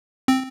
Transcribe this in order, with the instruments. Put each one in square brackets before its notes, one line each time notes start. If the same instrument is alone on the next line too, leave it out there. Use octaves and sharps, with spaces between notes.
[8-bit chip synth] C4